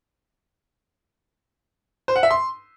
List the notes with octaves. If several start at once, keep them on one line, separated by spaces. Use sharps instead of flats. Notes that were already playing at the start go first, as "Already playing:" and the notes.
C5
F#5
E5
C6